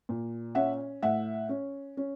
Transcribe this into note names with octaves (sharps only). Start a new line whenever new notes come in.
A#2
C#4 E5 F#5
A2 E5 F#5
C#4
C#4